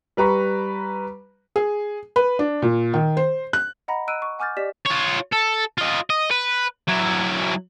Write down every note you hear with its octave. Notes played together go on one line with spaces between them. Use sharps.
G3 B4 A#5 C#6
G#4
B4
D4
A#2
D#3
C5
F#6
D#5 F#5 A#5 B5 A#6
D#5 A#5 E6 F#6 D7 D#7
C#6
F#5 G#5 D6 F6 G6 A6
G4 D5 D#5 B6 E7
F4 C#5
A4
F4 D#5
D#5
B4
F#3 E4